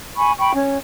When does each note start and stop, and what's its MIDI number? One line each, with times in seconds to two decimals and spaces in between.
0.16 0.32 80
0.16 0.32 83
0.16 0.32 85
0.39 0.52 79
0.39 0.52 83
0.39 0.52 85
0.54 0.76 61
0.54 0.76 73